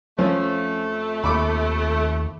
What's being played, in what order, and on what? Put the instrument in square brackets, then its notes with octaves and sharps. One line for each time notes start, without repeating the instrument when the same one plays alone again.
[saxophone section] F2 A3 [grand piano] F3 C#4
[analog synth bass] D#2 [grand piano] B5 C#6 D6